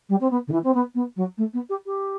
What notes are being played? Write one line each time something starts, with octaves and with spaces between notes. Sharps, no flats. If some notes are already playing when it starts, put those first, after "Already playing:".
G3
C4
B3
D3
E3
C4
B3
B3
F#3
A3
B3
G4
G4